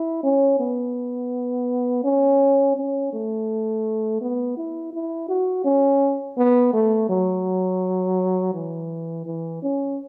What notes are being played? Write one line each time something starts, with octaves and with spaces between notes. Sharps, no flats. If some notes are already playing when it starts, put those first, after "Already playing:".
Already playing: E4
C#4
B3
C#4
C#4
A3
B3
E4
E4
F#4
C#4
B3
A3
F#3
E3
E3
C#4